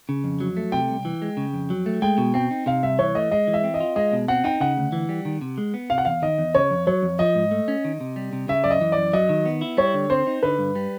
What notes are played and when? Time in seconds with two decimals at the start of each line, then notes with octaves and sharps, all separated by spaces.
0.09 C#3
0.24 F2
0.40 F#3
0.57 A3
0.72 C3 G5
0.89 C2
1.05 E3
1.22 G#3
1.37 C#3
1.53 F2
1.70 F#3
1.86 A3
2.02 G#3 G5
2.18 B2
2.34 C4 G5
2.51 D#4
2.66 C3 F5
2.83 C2 E5
2.99 E3 C#5
3.15 A3 D#5
3.31 G#3 D#5
3.47 E3
3.54 E5
3.64 C4
3.74 D#5
3.80 F4
3.96 G#3 D#5
4.13 B2
4.28 C4 F#5
4.44 D#4 G5
4.60 C#3 F#5
4.77 D2
4.92 E3
5.09 G3
5.25 D#3
5.41 C3
5.58 G#3
5.74 B3
5.90 C3 F5
5.98 F#5
6.05 E2 F5
6.22 D#3 D#5
6.38 E2
6.55 C#3 C#5
6.71 F2
6.87 F#3 C#5
7.03 F2
7.19 F3 D#5
7.35 G#2
7.51 A3
7.68 C#4
7.85 D#3
8.01 C3
8.16 G3
8.33 C3
8.48 C#3 E5
8.64 F#2 D5
8.71 D#5
8.81 E3
8.92 F#2 D5
9.13 F#3 D#5
9.29 D#3
9.46 B3
9.61 E4
9.77 G3 C#5
9.94 D3
10.10 C4 C5
10.27 D#4
10.43 D3 B4
10.59 G2
10.75 G3